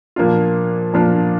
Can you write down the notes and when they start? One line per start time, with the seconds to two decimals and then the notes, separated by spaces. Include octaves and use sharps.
0.16 A#2 F3 A#3 D4 F4
0.94 A#2 F3 A#3 D4 F4